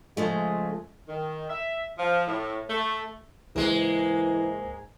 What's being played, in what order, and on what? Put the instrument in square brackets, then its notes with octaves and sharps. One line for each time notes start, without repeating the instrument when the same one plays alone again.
[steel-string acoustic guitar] C#3 F3 A3 [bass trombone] G#3
[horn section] D#3
E5
F3
A2
A3
[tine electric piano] C#2 [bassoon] G#2 [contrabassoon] E3 [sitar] G#3 A#3